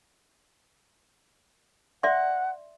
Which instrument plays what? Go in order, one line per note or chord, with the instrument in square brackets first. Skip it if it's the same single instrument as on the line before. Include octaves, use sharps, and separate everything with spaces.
[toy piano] D5 E5 C6 [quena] F#5